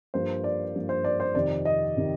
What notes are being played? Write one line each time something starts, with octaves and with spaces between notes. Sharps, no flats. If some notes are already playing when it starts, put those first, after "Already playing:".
G2 F3 A#3 C5
D5
G2 F3 A#3
C5
D5
C5
F2 C3 D#3 D5
D#5
C3 D#3